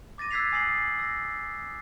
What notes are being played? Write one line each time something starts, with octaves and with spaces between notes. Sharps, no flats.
D6 A6 A#6 D#7
E6 F#6 G#6 B6 C7 F7
G#5 D#6 A6 A#6 C7 F#7
E6 A#6